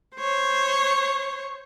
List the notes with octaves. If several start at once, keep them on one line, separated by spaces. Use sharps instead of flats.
C5 C#5